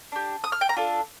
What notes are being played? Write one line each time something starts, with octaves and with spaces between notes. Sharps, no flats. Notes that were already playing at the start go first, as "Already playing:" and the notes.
D4 G4
D#6
F6
G5
A#5
D4 F4 A4